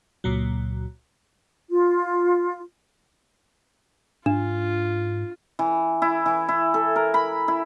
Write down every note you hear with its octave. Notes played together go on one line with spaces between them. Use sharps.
C#2 A#2 F#3
F4
G#2 D4 F4
E3
E4
E3
E4
A4
A#4
B5
E4